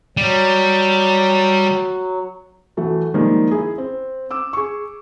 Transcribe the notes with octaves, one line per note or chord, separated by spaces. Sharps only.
F#3 G3
E3 F#3 A3
D#3 F3 G3 G#3 A#3
E4 G#4
C4
D6 E6
G#4 C#6